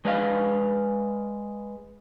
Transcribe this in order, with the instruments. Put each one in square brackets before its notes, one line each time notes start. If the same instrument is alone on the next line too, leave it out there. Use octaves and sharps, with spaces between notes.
[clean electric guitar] G#3 B4 D5 F5